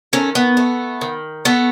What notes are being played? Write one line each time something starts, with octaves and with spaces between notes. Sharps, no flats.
D#3 A3 C#4
B3
A3
D#3
A3 B3